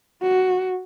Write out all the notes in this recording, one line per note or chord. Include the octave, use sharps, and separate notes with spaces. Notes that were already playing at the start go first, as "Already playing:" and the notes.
F#4